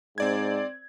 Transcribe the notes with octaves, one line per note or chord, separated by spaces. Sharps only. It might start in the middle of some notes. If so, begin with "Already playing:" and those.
G#2 C4 D5 G#6